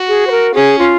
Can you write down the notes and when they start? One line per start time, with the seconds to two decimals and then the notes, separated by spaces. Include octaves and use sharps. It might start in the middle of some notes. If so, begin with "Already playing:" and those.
Already playing: F#4
0.08 G#4
0.27 C5
0.31 A#4
0.54 C#4 G#4
0.79 F4